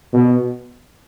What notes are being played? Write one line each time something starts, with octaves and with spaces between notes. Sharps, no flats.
B2